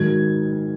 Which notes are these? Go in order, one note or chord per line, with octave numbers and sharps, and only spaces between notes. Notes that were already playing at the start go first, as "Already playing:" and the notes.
Already playing: G#2 D#3 F#3 G#6